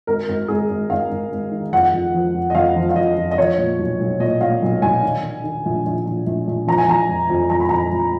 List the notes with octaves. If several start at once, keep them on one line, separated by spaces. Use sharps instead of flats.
G#1 A#4
G#1
G#1 G#4
G#1
G#1 F5
G#1
G#1
D#3
F2 F#5
F2
F3
F2
D#5
F2 F5
F3
F5
F2 D#5
F2
D#5
F3 C#5
A#2
B1
B1
A#2 D#5
A#2 F5
B1
B1 G#5
D#3
D#3
D#3
A#1
A#1
A#1
A#1
A#1
F3 A#5
G#5
F3 A#5
F2
F2
F2 A#5
B5
F2 A#5
F2